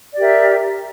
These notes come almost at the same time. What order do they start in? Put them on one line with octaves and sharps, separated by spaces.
D5 G4 A#4 E5